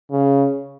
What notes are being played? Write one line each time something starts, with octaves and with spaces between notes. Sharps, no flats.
C#3